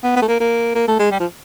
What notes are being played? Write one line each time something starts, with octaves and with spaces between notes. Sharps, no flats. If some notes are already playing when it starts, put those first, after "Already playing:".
B3
B3
A3
A#3
A#3
A#3
A3
G#3
G3
F3